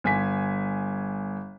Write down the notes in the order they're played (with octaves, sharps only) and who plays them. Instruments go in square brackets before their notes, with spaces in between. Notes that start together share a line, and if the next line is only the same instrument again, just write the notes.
[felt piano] G1 G#5 B6